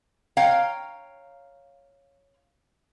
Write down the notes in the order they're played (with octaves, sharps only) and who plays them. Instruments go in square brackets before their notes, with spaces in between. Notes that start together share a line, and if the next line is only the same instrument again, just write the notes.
[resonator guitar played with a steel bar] C#5 F5 G5 A#5